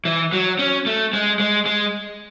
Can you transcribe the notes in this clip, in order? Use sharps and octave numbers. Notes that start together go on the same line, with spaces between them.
E3
F#3
C#4
A3
G#3
G#3
G#3